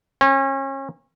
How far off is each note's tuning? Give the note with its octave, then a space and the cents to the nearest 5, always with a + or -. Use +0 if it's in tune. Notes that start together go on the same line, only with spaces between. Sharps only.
C#4 -35